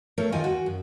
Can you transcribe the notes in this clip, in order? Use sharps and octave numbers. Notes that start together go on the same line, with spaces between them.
A3 A4 A#4 C#5
D#2 F4 D#5 G5 G#5
F#4
F#2